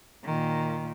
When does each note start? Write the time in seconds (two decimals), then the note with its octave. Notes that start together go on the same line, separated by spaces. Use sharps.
0.25 A#2 D#3